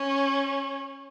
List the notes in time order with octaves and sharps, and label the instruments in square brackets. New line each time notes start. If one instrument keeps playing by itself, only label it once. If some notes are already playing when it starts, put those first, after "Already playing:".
Already playing: [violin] C#4